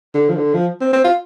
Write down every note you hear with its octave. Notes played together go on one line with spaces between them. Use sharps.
D3
F3
D3
F3
C4
C4
F4